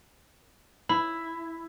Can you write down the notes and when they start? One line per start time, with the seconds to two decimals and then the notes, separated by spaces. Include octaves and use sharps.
0.89 E4 B5